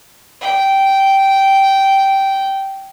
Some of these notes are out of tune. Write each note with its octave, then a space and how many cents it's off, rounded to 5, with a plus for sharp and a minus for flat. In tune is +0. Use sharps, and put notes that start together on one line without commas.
G5 -10